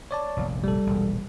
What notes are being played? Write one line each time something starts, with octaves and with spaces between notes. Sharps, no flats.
C#5 D5 A5
F1 A#1
G3 A4
E1 A#1